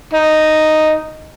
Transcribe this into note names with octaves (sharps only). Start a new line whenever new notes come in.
D#4